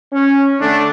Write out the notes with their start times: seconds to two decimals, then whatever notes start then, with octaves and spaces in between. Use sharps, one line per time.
0.12 C#4
0.60 D3 A3 D4